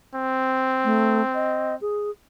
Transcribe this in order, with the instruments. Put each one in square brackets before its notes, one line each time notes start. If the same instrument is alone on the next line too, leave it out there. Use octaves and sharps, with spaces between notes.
[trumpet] C4
[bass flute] A3
D#5
G#4